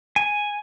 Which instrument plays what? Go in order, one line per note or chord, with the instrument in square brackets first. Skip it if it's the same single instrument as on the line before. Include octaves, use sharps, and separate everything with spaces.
[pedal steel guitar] G#5